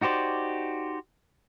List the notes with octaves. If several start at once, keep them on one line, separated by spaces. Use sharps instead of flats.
D#4 F#4 G4 C5 D5